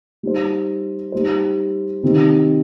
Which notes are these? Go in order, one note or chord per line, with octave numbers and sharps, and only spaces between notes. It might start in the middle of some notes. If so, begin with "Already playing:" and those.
G3 D#4 C5
G3 D#4 C5
C3 D#3 C4 D#4 G4